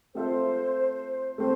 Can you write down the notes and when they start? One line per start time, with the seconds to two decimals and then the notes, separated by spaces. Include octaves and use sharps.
0.14 A3 C4 F4 A4 C5 E5
1.38 A3 C4 C5